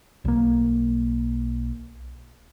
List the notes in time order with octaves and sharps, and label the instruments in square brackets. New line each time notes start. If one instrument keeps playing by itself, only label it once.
[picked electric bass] B1 A#3